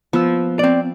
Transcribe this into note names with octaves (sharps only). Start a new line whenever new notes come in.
F3 B3 E6
C4 D5